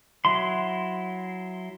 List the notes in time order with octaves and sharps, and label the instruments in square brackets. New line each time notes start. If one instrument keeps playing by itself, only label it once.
[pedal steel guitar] F#3 E4 C6